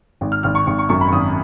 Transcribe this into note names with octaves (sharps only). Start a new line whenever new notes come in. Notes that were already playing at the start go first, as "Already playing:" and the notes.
G#1
F6
G#1 F6
C#6
G#1 C#6
C#6
F#2 C#6
B5
C#6
G#1 D#6